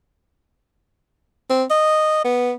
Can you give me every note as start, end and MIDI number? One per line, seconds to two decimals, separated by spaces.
1.50 1.64 60
1.70 2.21 75
2.25 2.53 59